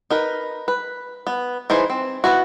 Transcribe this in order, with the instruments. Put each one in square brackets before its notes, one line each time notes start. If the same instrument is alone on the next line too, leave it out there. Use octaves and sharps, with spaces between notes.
[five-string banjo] D#4 A#4 B4
B4
B3
E3 D#4 G#4 C5
C4
B3 E4 F#4